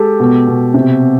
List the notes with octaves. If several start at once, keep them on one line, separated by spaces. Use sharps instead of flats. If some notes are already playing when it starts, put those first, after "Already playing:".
Already playing: G#3 G4 A4
B2
B2
C3